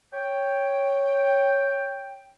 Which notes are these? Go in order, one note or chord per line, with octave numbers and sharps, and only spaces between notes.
C#5 G5